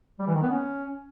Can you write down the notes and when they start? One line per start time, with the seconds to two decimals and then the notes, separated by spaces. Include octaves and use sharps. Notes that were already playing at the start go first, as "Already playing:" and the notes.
0.19 G3
0.27 E3
0.34 D#3
0.42 B3
0.49 C#4